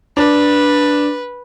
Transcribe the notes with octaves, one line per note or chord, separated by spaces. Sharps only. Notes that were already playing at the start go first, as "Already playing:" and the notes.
D4 B4